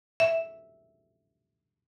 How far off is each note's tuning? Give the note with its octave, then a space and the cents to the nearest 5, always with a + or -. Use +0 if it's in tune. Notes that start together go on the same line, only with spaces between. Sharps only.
E5 -5